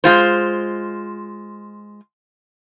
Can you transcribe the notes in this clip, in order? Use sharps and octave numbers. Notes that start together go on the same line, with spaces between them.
G#3 F4 C5